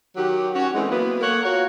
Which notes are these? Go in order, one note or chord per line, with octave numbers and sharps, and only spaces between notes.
D#3 F#3 G4
C#4 F#4
E3 G#3 A3 C4 G#4
F#3 A#3 B3
A3 A#3 C#5 F#5
F4 F#4 A#4 C#5